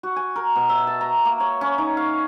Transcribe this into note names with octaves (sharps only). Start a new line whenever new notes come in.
F#4
G#5
A#4
B2
E5
A5
A#5
A#3
C#5
C#4
D#4
F5